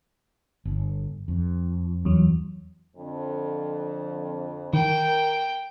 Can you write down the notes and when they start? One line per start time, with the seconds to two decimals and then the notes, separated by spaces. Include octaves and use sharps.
0.65 G1
1.28 F2
2.05 E2 F#3
2.97 F2 D3
4.73 D#3 A#4 G5